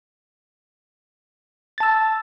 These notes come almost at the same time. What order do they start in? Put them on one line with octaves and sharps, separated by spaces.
A6 A5 E6